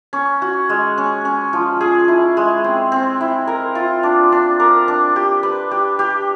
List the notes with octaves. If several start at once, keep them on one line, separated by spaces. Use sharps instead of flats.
C#4
F#4
G#3
C#4
C#4
F3
G#4
E4
G#3
C4
C4
E4
A#4
F4
D4
D4
A#4
D4
G4
B4
G4
G4